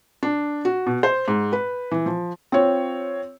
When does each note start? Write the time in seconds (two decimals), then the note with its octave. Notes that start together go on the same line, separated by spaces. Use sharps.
0.23 D4
0.65 F#4
0.87 B2
1.03 C5
1.28 G#2
1.53 B4
1.91 E3
2.06 F3
2.52 C4 F4 C#5